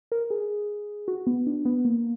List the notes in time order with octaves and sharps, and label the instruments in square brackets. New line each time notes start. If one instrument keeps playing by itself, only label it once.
[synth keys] A#4
G#4
F#4
B3
D4
B3
A#3